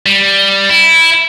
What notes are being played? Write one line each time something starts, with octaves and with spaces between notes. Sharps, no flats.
G3
E4